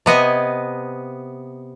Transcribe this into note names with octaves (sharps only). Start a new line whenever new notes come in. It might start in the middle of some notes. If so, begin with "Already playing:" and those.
C3 B3 D#5 G#5